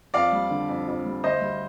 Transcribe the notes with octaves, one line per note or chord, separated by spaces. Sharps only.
F2 D5 F5
G3
D3
F2
F2
G3
D2 C5 D#5
G3